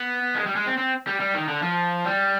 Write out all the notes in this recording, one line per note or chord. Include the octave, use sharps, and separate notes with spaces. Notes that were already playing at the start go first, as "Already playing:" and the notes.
Already playing: B3
G#3
G3
G#3
C4
C4
G3
G3
D#3
D3
F3
G3